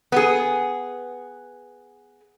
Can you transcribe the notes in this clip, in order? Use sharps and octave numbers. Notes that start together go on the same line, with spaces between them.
B3 G#4